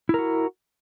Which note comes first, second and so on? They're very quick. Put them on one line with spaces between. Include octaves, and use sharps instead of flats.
E4 A#4 F#4